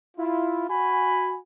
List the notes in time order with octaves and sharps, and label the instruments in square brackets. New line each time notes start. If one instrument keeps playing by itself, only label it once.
[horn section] E4 F4
F#4 G#5 B5